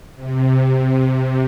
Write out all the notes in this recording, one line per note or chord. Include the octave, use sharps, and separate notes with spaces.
C3